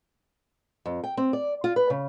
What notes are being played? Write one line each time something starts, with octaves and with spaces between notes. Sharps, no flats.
F2
G5
C4
D5
F4
B4
C#3